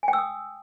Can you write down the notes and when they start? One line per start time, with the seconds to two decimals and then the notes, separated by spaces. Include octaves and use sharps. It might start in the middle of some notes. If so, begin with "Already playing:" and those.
0.03 G#5
0.08 G5
0.13 E6
0.18 D#6